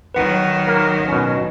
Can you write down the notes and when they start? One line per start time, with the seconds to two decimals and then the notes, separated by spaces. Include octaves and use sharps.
0.14 D#3 F#3 B4 F#5
0.67 A#3 A#4
1.08 B2 C#4